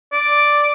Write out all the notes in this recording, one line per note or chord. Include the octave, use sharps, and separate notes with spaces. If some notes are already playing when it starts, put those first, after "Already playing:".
D5